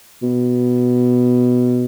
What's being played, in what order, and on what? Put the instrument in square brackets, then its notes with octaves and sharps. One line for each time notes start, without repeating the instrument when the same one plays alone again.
[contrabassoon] B2